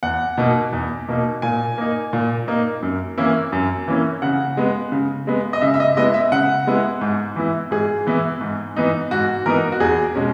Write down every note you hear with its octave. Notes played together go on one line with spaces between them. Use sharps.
E2 F#5
B2 A#3 D#4
E2
B2 A#3 D#4
A#2 G#5
A#3 D#4
A#2
A#3 D#4
F#2
E3 A#3 C#4 E4
F#2
E3 A#3 C#4 E4
C#3 F#5
G#3 B3
C#3
G#3 B3
D#5
C#3 E5
E5
D#5
G#3 B3 E4 D#5
E5
C#3 F#5
G#3 B3 E4
G#2
E3 B3 E4
G#2 G#4
E3 B3 E4
G#2
E3 B3 D#4
G#2 F#4
E3 B3 D#4 A#4
F#4
E2 G#4
B2 G#3 C#4